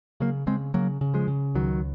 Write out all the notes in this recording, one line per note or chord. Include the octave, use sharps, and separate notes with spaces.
C#3 F#3 A#3
C#3 G#3 C4
C#3 F#3 A#3
C#3
F3 G#3
C#3
C#2 D#3 F#3